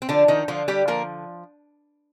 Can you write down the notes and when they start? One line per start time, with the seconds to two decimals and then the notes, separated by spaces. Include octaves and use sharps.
0.02 C4
0.09 D3 F3 D4
0.28 D#3 D#4
0.48 D3 F3 F4
0.68 G3 G4
0.88 F3 A#3 A#4